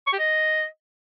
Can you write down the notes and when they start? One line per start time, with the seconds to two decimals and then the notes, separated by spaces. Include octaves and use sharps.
0.07 C#6
0.13 G4
0.19 D#5